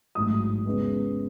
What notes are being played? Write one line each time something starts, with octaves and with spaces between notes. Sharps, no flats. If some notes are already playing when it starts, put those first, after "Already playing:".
A1 G#2 F#3 D#6
E2 C#3 G#3 B3